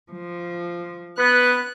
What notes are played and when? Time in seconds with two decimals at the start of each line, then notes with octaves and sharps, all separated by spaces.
0.11 F3
1.19 B3 B4 F#6